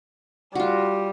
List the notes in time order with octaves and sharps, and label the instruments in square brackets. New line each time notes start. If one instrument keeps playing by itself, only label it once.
[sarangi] G3 [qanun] F4 F#4